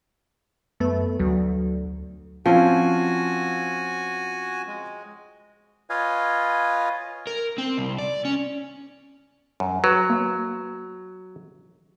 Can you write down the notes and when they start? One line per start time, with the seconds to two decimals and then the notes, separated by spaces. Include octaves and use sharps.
0.80 F#2 A3 B3 B4
1.19 D2 F#3
2.46 F3 C4 C#4 F4 F#4 G#5
4.67 G#3
5.90 F4 B4 C#5 D#5 F5 G#5
7.27 A#4
7.58 C4
7.78 C2
7.99 D5
8.25 C#4
9.60 F#2
9.84 F#3 B4
10.10 A#3